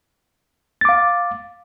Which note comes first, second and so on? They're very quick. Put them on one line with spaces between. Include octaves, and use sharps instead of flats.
A6 D6 F5